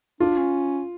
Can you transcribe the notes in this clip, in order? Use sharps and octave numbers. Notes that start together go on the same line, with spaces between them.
D4 F4
C#4